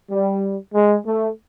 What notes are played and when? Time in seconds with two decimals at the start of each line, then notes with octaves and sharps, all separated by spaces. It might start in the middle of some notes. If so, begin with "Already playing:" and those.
0.10 G3
0.74 G#3
1.05 A3